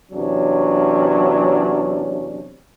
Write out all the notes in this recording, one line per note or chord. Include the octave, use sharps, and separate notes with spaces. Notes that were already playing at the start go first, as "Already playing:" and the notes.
E2 C3 F#3 C#4 D4